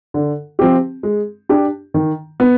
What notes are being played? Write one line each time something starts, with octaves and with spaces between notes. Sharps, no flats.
D3
F3 C4 G4
G#3
D4 G4
D#3
B3